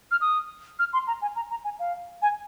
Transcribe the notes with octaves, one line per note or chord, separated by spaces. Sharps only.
F6
D#6
F6
C6
A#5
G#5
A#5
A#5
G#5
F5
G#5